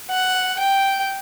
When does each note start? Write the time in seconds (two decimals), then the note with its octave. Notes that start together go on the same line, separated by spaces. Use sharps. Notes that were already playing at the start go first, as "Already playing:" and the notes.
0.11 F#5
0.59 G5